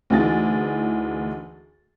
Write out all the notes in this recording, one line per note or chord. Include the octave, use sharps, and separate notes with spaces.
D2 E3 D#4 G#4 A6